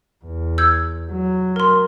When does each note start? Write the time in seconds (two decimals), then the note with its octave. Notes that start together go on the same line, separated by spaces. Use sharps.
0.25 E2
0.58 E6 G6 G#6
1.11 F#3
1.56 A#4 C6